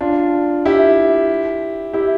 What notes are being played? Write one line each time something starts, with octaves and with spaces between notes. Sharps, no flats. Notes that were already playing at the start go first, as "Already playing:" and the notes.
D4 F4
E4 G4
E4 G4